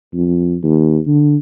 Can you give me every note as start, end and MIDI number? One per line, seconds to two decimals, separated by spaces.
0.14 0.56 41
0.63 0.98 39
1.07 1.36 50